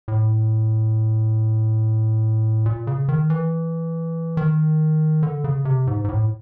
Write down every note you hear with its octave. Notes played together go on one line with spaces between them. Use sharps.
A2
A#2
C#3
D#3
E3
D#3
D3
C#3
C3
G#2
G#2
A2